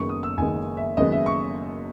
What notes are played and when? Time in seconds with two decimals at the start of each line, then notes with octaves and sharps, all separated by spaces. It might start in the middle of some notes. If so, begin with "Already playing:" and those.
Already playing: F#1 F#2 D#3 G#3 B3 C#6
0.09 D#6
0.23 E6
0.38 F#1 F#2 D#3 G#3 B3 G#5
0.77 E5
0.97 F#1 F#2 D#3 G#3 B3 D#5
1.12 E5
1.26 C#6